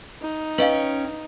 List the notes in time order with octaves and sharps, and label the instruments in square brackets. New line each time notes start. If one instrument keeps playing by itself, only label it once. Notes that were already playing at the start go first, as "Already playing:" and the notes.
[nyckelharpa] D#4
[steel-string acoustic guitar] C#4 C#5 G5 [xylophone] B4 D#5 F5